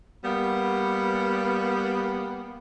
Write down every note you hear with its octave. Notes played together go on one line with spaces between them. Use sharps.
G3 A#3 B3